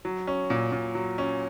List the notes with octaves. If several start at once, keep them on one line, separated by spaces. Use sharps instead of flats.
F#3
C#4
A#2
A#2
F#3
C#4